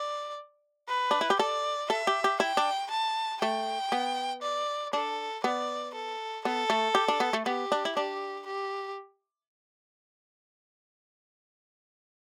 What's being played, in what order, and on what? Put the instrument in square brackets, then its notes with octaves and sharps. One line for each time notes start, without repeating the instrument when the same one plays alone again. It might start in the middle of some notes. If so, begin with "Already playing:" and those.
Already playing: [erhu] D5
B4
[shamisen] D4
E4
G4
[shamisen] A4 [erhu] D5
[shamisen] A4 [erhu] E5
[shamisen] G4
G4
[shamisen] E4 [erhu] G5
[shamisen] D4
[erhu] A5
[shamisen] A3 [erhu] G5
[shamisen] B3
[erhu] D5
[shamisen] D4 [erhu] A4
[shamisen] B3 [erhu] D5
[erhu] A4
[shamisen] B3 [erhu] A4
[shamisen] A3
G4
D4
B3
A3
[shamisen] B3 [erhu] G4
[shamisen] D4
E4
[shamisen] D4 [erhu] G4
[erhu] G4